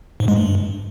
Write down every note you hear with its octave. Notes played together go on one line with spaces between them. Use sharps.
G#2
G#3
G2